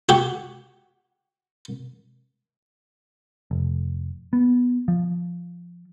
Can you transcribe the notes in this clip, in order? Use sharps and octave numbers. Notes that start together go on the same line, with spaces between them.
F#4 G4
F1
B3
F3